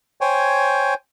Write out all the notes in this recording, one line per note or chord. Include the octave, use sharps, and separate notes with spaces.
C5 C#5 G5 G#5